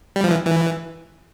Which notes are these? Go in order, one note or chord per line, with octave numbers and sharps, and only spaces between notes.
G3
F3
E3
E3